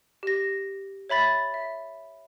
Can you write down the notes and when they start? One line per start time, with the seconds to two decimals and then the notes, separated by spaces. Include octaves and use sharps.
0.23 G4 A#6
1.09 C#5 E5 B5 A6 B6
1.54 E5